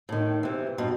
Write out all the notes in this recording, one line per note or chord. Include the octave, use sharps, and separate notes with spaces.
A2 D#3
C3 E3
G2 B2